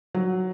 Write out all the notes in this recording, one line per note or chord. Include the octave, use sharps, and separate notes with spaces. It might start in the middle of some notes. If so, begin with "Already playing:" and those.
F#3